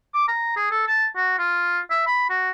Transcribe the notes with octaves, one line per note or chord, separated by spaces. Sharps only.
D6
A#5
G#4
A4
A5
F#4
F4
E5
B5
F#4